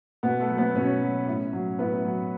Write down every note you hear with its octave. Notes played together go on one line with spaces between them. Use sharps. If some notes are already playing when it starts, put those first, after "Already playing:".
B2 B3 B4
A3 A4
F#3
B3 B4
B2 C#4 C#5
F#3
A2
F#3
A2 B3 B4
F#3